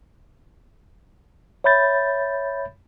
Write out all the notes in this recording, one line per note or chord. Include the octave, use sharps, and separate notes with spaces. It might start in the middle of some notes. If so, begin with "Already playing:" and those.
C#5 E5 B5 G6 A6